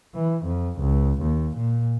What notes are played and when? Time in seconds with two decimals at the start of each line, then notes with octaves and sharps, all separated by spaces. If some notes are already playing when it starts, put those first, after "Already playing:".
0.14 E3
0.45 F2
0.80 C#2
1.22 D#2
1.57 A#2